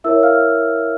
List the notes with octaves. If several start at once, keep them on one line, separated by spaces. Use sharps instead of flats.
E4 A#4 C#5 E5 E6
F5 F6